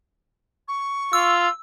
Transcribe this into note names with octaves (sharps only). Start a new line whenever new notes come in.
C#6
F4 E6